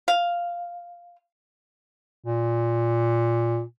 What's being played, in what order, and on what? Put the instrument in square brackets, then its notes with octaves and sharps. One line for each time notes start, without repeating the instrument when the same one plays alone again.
[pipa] F5
[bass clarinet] A#2